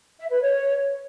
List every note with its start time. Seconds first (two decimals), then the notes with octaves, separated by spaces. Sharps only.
0.18 E5
0.29 B4
0.40 C#5